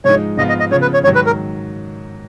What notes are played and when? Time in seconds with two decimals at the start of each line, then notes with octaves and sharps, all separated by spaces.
0.05 G#2 F3 G#3 D#4 C#5
0.38 G#2 F3 B3 F4 D#5
0.49 D#5
0.60 D#5
0.71 C#3 F3 B3 C#5
0.82 B4
0.94 C#5
1.04 G#2 D#3 F#3 C#5
1.15 B4
1.27 A#4